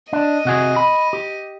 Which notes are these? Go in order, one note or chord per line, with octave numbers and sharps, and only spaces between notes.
D4 D#5
C3 F#4 G#4
B5
G4